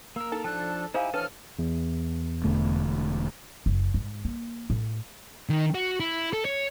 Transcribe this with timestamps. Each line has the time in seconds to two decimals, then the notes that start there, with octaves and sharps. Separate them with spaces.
0.16 A#3 A#4 E6
0.32 D#4 A4
0.44 F3 D4 A5 F#6
0.94 D#4 E4 G4 C5 F5 G#5
1.14 E3 D4 F#4 A4 B4 C#5 D#6 F6
1.59 E2
2.44 E1 D3 A3
3.66 F#1
3.94 G#2
4.25 A#3
4.70 A2
5.49 D#3
5.75 F#4
6.00 E4
6.33 A4
6.45 C#5